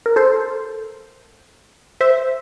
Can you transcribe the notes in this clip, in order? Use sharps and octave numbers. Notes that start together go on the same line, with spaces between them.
A#4
A4 C5
C5 E5